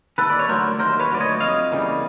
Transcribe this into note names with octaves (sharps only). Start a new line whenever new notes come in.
D#2 A4 B4
D5
C#5
D3 F#3 A3 A#4 C5
D#2 A#4 C5
B4 C#5
D3 F#3 A3 D5
C#5 D#5
F2 D#5 F5
C#3 E3 G3 A#3